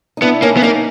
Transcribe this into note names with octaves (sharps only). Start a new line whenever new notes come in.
D#4
B3 D4 E4
A#3 C#4 D#4
B3
A#3 C#4 D#4